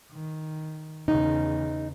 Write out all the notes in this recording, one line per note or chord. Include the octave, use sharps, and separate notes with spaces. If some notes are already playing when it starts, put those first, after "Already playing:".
D#3
E2 C#3 D#4